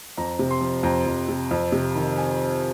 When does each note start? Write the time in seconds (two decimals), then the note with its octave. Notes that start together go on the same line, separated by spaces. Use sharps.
0.17 F2 A#5
0.39 C3
0.51 C6
0.61 F3
0.83 F2 A#5
1.06 F2
1.28 C3
1.51 F2
1.72 C3
1.95 D#3
2.18 G#5